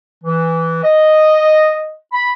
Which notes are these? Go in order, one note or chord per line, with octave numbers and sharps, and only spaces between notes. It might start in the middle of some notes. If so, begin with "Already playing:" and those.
E3
D#5
B5